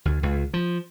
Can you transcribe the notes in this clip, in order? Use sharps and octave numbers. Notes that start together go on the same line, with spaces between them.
D2
C#2
F3